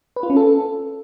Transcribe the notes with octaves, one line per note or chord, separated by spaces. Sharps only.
B4
F4
C#4
A4